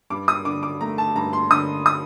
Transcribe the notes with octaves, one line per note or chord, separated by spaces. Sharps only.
G2 D6
D#6
D3 D6
D6
A3 A#5
A5
G2 A#5
C6
D3 D#6
D#6